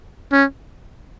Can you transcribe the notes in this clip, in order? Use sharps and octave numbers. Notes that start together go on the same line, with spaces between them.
C#4